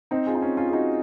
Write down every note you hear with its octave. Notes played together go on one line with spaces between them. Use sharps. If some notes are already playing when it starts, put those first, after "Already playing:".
C4 D#4
F4 G#4
D#4
C#4 F4
C#4 F4
G#4
D#4 F#4